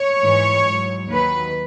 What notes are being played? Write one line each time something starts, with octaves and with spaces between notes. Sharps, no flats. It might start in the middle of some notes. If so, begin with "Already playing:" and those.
Already playing: C#5
G#2 E3 G#3
G#2 F#3
D#2 D#3 F#3 B4